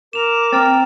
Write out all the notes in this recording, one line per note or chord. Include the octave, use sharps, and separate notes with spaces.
A#4 D6 E7 F7
C4 A#5 F6 A6